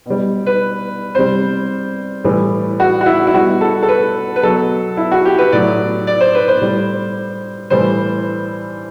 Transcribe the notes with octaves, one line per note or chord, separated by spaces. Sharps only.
B2 G3
B4
C3 G3 C5
A2 E3 G3
F#4
F#4
E4
E4
B2 G3 F#4
A4
A4
B4
B4
B2 F#3 A4
E4
F#4
G4
B4
A2 F#3 D5
D5
C5
B4
C5
A2 G3
A2 E3 G3 C5